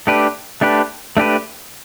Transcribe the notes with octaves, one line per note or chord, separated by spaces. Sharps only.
A3 D4 G4 B4
A3 D4 G4 B4
A3 D4 G4 B4